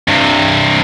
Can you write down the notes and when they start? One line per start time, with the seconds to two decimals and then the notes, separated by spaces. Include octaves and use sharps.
0.08 G2 C3